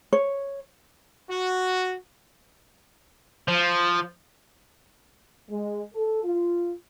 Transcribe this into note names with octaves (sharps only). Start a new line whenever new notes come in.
C#5
F#4
F3
G#3
A4
F4